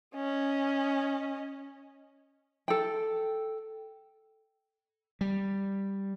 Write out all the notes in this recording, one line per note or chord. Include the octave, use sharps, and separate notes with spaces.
C#4 D#5
A4 G5
G3